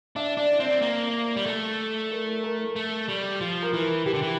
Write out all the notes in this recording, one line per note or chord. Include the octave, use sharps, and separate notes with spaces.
D4 E5
D4 D5
C4 D5
A#3
G3
A3
A#4
A#4
A3
G3
F3
A#4
E3
E3 G4
D3
E3